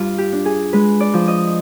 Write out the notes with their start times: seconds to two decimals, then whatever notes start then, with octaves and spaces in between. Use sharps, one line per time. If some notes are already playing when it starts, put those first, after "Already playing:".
Already playing: G2 F4
0.18 G4
0.33 D4
0.45 G#4
0.73 G#3 B4
1.00 D5
1.14 F3
1.28 D#5